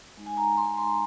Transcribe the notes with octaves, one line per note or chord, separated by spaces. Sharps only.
G#3 D#4
G#5
A#5
C6
C6